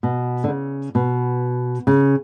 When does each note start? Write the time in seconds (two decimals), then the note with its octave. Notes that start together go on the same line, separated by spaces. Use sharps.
0.03 B2
0.44 D3
0.48 C#3
0.95 B2
1.87 C#3